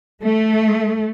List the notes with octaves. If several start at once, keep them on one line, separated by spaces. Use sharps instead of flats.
A3